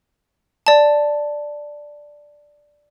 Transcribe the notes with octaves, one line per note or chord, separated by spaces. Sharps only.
D5 A5